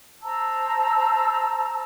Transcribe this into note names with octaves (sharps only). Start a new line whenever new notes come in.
C5 A5 A#5 E6